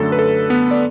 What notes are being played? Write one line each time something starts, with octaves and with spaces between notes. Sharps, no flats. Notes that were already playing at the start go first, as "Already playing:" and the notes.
Already playing: F#2 D3 A3 D4 A4
B4
A4
B3 B4
D5